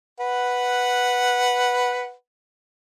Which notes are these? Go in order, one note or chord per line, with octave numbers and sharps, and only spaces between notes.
B4 F#5